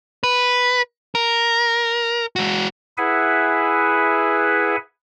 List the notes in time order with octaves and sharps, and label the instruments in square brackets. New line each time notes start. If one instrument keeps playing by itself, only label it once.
[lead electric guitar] B4
A#4
G#3 F#4
[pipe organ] E4 G#4 B4 E5 F#5 G#5